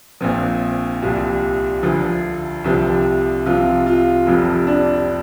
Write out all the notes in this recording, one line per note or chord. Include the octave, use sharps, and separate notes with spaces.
A#1 A#2 F3 C4
C2 A#2 F3 G3
D2 D3 F3
C2 C3 F3 G3
C2 C3 F3 F4
F4
F1 F2 C3 F3
D4